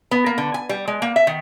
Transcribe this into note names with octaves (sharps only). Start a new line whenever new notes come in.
B3
A#3
D3
G#5
G3
G#3
A#3
E5
D#3